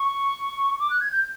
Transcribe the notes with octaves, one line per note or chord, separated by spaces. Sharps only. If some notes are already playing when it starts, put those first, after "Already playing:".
Already playing: C#6
D6
F#6
G#6
G6